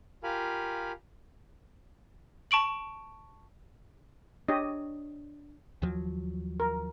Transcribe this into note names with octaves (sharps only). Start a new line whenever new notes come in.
F4 G4 A#4 F5 G#5 B5
A5 C#6 D7 F#7
D4 G4 C#5 D#5
D#2 F3 F#3
A#4